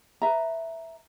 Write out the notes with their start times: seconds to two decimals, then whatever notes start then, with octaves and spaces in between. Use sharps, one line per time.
0.22 B4 E5 A#5